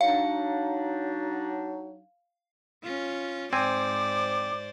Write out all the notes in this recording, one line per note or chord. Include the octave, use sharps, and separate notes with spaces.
F#3 D4 D#4 F5
C#4 F4
G#2 C4 C5 D5 G#5 D6